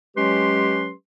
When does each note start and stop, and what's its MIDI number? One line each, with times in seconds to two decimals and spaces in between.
0.16 0.91 54
0.16 0.91 56
0.16 0.91 61
0.16 0.91 67
0.16 0.91 71
0.16 0.91 84